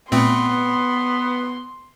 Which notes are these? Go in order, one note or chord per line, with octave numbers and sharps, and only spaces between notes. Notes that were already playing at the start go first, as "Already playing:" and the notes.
A#2 A3 B3 C4 C6